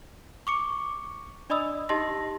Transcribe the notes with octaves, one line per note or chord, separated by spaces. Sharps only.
C#6 D6 C#7
D4 D5 D#5 B5 D#6 E6
D#4 G4 D#5 A5 C6 A#6